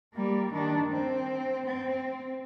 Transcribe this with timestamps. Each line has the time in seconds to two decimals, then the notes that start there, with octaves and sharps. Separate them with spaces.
0.14 G3 A#3
0.53 D#3 D4
0.91 C4
1.66 C4